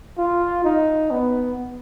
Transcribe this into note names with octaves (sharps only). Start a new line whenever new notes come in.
F4
D#4
B3